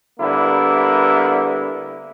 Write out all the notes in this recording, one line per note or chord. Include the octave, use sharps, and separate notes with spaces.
D3 G3 A#3 B3 E4